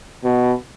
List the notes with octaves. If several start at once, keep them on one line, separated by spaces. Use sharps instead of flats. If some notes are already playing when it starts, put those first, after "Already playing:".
B2